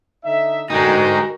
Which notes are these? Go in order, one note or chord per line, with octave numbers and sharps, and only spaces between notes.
D3 D#4 E5
D3 G#3 D#4 F#4 A#4 G5